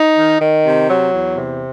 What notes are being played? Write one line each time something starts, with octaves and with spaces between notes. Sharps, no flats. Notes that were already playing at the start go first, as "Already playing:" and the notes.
Already playing: D#4
D#3
D#3
C3
F#3
E2
C3